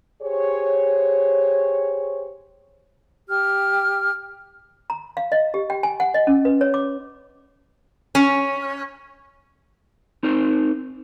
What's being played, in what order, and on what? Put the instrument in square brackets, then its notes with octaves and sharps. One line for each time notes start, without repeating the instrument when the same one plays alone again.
[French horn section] G4 G#4 C5 C#5
[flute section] G4 F6
[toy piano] A#5
F5
D#5
G4
G5
G#5
F#5
D#5
C#4
B4
C#5
D6
[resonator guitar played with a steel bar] C#4
[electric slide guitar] C4 D#4 A#4 C5